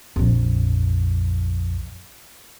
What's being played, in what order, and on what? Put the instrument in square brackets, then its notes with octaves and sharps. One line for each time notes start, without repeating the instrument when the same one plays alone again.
[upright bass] A#1 F2